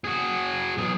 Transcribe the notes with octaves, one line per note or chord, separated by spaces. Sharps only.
F#4 G#4
B1 G#4